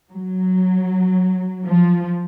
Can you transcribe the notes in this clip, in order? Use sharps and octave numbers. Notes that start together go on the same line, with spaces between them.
F#3
F3